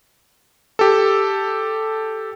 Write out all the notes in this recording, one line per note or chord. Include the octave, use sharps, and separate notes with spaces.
G4 A4